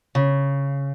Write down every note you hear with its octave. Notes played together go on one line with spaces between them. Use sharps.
C#3